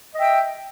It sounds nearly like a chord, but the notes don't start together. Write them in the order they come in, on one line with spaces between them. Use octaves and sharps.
D#5 E5 G5